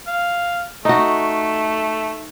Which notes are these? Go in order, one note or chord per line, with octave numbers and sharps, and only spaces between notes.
F5
A3 D#4 F#4